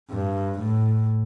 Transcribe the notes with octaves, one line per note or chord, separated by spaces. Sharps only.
G2
A2